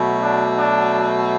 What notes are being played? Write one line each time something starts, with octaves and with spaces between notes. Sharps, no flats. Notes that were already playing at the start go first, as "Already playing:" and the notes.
Already playing: B2 F#3 A3
D4
D4